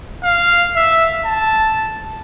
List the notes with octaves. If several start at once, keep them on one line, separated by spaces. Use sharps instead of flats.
F5
E5
A5